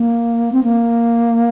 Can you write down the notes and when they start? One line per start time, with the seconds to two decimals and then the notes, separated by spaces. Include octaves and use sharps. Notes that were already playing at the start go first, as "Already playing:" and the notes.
Already playing: A#3
0.52 C4
0.64 A#3